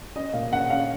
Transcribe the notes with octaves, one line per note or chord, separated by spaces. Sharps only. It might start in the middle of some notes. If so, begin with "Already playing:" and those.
C#4 D#5
A#2 F5
C#4 F#5
C#4 F5